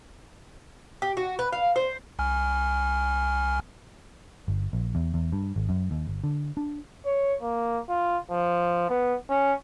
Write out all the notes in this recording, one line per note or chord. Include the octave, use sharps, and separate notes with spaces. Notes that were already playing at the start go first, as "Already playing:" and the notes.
G4
F#4
B4
F5
C5
C2 G#5 F6
G1
A#1
E2
E2
G2
G#1
F#2
D#2
G1
D3
D4
C#5
A#3
F4
F3
B3
C#4